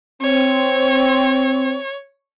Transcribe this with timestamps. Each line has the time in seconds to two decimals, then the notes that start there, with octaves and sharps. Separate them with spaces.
0.22 C4 C#5